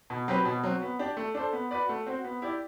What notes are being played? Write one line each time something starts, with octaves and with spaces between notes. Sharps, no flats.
B2
F#3 C4 G4 B4
B2
F#3 C4
B3
D4 G4 D5
A3
D4 A4 C5
B3
F#4 B4 D5
A3
C4 F#4 C5
B3
E4 G4 D5